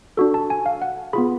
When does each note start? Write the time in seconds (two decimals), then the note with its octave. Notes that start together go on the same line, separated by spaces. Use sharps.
0.17 D4 F#4 A4
0.34 A5
0.50 G#5
0.66 F5
0.82 F#5
1.13 B3 F4 G#4 B5